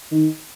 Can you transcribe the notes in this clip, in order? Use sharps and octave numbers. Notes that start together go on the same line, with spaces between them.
D#3